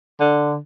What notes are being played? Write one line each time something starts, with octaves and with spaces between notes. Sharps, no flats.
D3